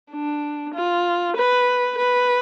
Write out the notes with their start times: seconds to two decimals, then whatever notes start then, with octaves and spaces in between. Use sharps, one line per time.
0.11 D4
0.74 F4
1.36 B4
1.98 B4